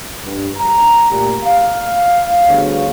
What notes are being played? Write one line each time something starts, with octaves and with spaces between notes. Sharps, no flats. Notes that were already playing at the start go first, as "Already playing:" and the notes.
G2
A#5
A#2 A3 G4
F5
D2 D3 G3 B3 G#4 C#5